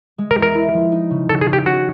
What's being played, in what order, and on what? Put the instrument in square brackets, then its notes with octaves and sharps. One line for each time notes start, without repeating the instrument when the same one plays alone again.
[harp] G#3
[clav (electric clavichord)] A#4
[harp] E2
[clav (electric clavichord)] A#4
[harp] E4
F3
D#4
C#3
[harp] C#3 [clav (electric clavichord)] A4
[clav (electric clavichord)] G#4
[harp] C#3
[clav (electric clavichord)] G4
[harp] C#4 [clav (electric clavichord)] F#4